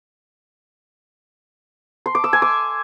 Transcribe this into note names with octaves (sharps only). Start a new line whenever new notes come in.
C6
D6
E6
G#5
D6